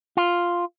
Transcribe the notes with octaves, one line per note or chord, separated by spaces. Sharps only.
F4